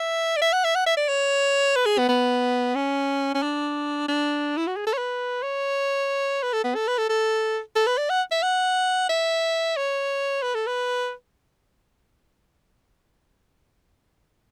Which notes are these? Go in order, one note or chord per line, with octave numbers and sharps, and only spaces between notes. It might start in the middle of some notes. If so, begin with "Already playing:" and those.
Already playing: E5
D5
E5
F#5
E5
F#5
E5
D5
C#5
B4
G#4
B3
B3
C#4
C#4
D4
D4
E4
F#4
G#4
A4
C#5
B4
C#5
B4
A4
B3
A4
B4
A4
A4
A4
B4
D5
F#5
E5
F#5
E5
C#5
B4
A4
B4